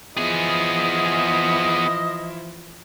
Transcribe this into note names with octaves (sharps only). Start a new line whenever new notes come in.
E3 F3 B3 E4 G#4 D#5